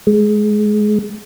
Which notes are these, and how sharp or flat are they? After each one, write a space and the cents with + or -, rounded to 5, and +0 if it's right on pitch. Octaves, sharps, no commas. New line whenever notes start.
G#3 +20